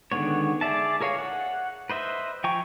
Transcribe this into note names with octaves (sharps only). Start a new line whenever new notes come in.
D3 D#3 G#3 B3 C#5
G#4 D5 E5 A5
G#4 A#4 C#5 F5 G#5
F#5
B4 C5 D#5 E5
F3 G5 G#5 A#5 C#6